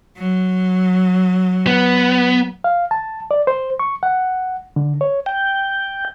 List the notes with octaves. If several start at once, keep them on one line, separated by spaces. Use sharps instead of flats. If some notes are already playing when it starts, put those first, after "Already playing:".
F#3
B3
F5
A5
D5
C5
C#6
F#5
D3
C#5
G5